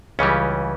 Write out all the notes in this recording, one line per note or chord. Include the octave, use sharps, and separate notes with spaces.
C#2 C#3 E3 G3 C#4